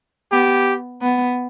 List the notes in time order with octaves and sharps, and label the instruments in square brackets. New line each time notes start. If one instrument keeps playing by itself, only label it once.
[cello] B3 [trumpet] G4
[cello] B3